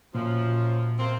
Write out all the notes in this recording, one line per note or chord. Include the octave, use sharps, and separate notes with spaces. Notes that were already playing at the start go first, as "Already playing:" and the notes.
F#2 A#2 F3
C3 A#3 C4